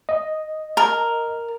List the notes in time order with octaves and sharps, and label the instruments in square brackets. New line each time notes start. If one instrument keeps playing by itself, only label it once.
[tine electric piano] D#5
[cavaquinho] A#4